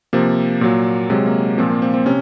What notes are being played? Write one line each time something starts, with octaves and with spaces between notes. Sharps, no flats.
C3 F3 A#3
A#2 F#3
C3 F#3 G#3
A#3
A#2 F3 C4
A#3
C4
C4
C3 C#4